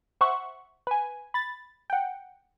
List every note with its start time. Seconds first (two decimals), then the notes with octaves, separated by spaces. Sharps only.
0.21 C5 E5 F#5 C#6
0.87 B4 G#5
1.34 B5 A6
1.90 F#5 G5